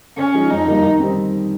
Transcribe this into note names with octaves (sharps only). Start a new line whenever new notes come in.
C#3 C#4
F3 G#3 D#4
F2 D#4
D#3 G3 A#3
D#3
G3 C4 D#4